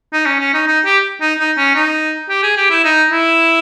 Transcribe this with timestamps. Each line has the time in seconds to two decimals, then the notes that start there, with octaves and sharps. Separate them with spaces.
0.13 D#4
0.26 C#4
0.40 C#4
0.54 D#4
0.67 D#4
0.85 G4
1.21 D#4
1.39 D#4
1.57 C#4
1.75 D#4
2.29 G4
2.43 G#4
2.57 G4
2.70 E4
2.84 D#4
3.11 E4